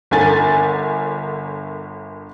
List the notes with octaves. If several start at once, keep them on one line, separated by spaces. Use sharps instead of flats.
G1 D3 A#4 G#5 A6